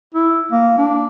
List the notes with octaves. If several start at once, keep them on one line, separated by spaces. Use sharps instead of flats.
E4
A#3
D4